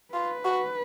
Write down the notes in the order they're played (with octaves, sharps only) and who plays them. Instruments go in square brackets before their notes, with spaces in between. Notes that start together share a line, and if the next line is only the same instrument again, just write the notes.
[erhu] F4 [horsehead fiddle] B4
[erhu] F#4